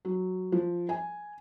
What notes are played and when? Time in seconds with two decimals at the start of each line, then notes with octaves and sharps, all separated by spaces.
0.05 F#3
0.52 F3
0.89 G#5